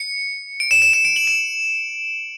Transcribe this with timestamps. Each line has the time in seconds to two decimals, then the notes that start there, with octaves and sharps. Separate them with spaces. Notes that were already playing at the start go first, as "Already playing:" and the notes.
Already playing: C#7
0.60 D7
0.71 E7
0.82 E7
0.93 E7
1.05 D7
1.16 F#7
1.27 E7